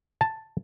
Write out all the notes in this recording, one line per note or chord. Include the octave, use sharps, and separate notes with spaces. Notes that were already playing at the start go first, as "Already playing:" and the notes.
A5